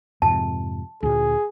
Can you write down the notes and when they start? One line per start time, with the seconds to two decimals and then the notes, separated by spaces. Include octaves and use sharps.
0.22 F2 G#2 C3 A5
1.03 D2 A#2 G#4